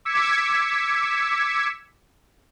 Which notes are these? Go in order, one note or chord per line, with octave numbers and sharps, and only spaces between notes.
D6 E6 G#6 B6 C#7 E7